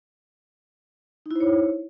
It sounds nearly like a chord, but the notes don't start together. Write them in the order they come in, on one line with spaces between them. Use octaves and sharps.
D#4 E4 C5 C#5